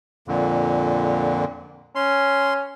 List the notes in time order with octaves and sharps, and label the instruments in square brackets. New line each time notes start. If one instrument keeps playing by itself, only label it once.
[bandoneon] F2 A#2 D3
[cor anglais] C#4 [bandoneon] C6